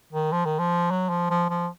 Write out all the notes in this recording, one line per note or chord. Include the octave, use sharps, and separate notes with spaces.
D#3
F3
D#3
F3
F#3
F3
F3
F3